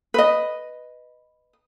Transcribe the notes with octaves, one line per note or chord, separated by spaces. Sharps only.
B4 D#5